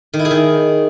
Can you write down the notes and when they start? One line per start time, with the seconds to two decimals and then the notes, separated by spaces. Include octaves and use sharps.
0.13 D#3
0.19 E4
0.25 G#4
0.31 D#3